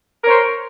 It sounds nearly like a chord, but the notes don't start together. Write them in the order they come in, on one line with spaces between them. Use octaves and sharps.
A#4 C#5 C5